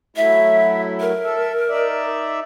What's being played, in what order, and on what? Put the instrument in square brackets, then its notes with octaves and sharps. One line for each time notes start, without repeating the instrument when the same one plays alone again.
[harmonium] F#3 A3 E4 [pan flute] E5
[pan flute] A#4
[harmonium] A4 E5
D#4 D5 E5